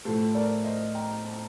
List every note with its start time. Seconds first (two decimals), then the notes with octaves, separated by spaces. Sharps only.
0.05 A2 F3 A3 A4 C5
0.35 A#4 D5
0.64 C5 D#5
0.94 G5 A#5
1.25 A5
1.31 A#5